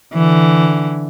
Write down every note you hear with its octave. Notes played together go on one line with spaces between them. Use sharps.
D3 E3